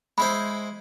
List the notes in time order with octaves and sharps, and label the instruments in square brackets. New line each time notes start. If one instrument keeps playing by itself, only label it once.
[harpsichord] G#3 E4 C5 [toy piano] B5